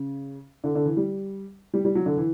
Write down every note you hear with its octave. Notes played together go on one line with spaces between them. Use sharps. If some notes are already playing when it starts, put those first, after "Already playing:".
Already playing: C#3
D3
D3
E3
G3
G3
G3
F#3
D3
E3